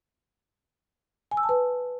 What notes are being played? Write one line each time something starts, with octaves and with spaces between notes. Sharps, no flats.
G#5
E6
A5
B4